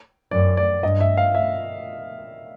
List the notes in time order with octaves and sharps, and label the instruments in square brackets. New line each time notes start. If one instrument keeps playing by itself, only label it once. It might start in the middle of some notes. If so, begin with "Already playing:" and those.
[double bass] F#2 [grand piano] D5
[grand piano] D5
[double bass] G2 [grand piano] D#5
[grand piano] E5
F5
E5